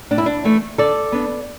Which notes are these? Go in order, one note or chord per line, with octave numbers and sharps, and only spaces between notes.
A2 D4
E4
D4
E3 A3 D4
D3 A4 D5
B3 D4